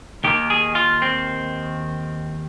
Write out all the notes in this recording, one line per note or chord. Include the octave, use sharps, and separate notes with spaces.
D#2 D#3 A#3 G4
G#4
F4
C4